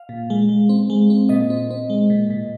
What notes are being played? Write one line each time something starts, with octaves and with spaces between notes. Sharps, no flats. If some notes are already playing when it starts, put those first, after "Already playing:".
Already playing: F5
A#2
G#3
G#3
C4
G#3
C4
A#2 D#5
C4
C4
G#3
A#2
A#2